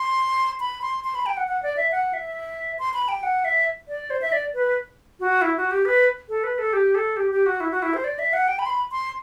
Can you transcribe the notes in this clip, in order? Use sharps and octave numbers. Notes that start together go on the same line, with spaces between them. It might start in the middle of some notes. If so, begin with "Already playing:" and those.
Already playing: C6
B5
C6
C6
B5
G5
F#5
F#5
D5
E5
F#5
E5
C6
B5
G5
F#5
E5
D5
C5
E5
D5
B4
F#4
E4
F#4
G4
B4
A4
B4
A4
G4
A4
G4
G4
F#4
E4
F#4
E4
C5
D5
E5
F#5
G5
B5
C6
B5
C6